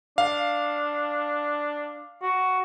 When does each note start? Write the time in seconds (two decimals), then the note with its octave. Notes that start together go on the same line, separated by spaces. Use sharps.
0.18 D4 F5
2.22 F#4